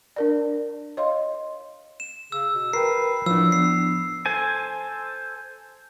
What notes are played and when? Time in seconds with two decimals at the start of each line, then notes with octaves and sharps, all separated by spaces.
0.16 D4 A#4 D5
0.97 C#5 D#5 F5 C6
2.00 E7
2.32 C#3 E6
2.55 B2
2.73 A#4 B4 G5 C7
3.26 A2 F3 D4 E6
3.52 B3 C7
4.26 A4 C5 G#5